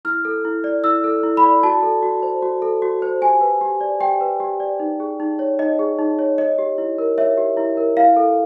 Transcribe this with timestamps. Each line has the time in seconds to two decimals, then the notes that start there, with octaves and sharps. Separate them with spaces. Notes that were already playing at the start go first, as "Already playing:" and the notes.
0.05 E4 F6
0.25 A4
0.45 E4
0.64 D5
0.84 E4 E6
1.04 A4
1.23 E4
1.37 B5
1.43 D5
1.63 F#4 A5
1.83 A4
2.03 F#4
2.23 C5
2.42 F#4
2.62 A4
2.82 F#4
3.02 C5
3.22 G4 G#5
3.41 B4
3.61 G4
3.81 D5
4.01 G4 G5
4.21 B4
4.40 G4
4.60 D5
4.80 D#4
5.00 G#4
5.20 D#4
5.39 C#5
5.59 D#4 D#5
5.79 G#4
5.99 D#4
6.19 C#5
6.38 C#5 D#5
6.59 G4
6.78 E4
6.98 A#4
7.18 C#5 E5
7.37 G4
7.57 E4
7.77 A#4
7.97 E4 F5
8.17 A4